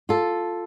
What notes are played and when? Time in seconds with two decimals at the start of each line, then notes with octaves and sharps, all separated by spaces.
0.09 F4 A4